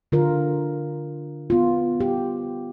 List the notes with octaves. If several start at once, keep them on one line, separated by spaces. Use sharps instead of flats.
D3 F4 A#4
B3 F4
G4